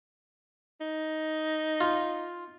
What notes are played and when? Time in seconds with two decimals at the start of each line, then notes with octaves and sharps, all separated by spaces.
0.81 D#4
1.81 F4